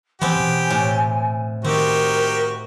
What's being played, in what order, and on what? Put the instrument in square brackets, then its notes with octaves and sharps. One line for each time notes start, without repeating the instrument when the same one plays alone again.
[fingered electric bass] E3 [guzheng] B3 C4 [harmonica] G4 [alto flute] G#5
[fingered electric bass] B2 E3
[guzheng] A2
[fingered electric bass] D#3 [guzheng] C4 [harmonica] D#4 F#4 G4 [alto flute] A#4